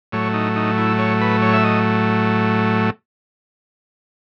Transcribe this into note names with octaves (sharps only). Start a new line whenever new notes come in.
A2 F#3 A3 C#5
D#4
D#4
E4
C#5
B4
C#5
E5
D#5